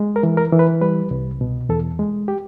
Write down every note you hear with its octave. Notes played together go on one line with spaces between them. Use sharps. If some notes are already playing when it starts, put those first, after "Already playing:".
Already playing: G#3
A#4
E3
A#4
E3
B4
G3 B4
C2
B2
E2 A4
G#3
G4